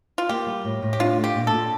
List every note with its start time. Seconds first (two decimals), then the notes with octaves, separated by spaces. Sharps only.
0.18 F4
0.29 A#3 G4
0.47 G3
0.65 A2
0.82 A2
0.93 G4
1.00 D4 F4
1.18 A3
1.24 G4
1.35 A#2
1.47 A4
1.53 A#2